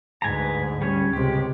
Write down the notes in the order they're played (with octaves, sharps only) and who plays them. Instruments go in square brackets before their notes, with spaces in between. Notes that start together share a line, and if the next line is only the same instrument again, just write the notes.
[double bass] D2 G#2 [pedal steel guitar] B4 G#5 A#5
[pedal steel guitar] G3 C#4 C#5
[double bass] C#2 C3 [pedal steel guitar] G4